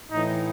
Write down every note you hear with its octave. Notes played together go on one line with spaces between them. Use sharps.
A2 E3 D#4